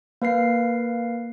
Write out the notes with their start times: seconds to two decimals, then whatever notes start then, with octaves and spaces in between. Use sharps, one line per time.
0.22 A#3 B4 F5 C7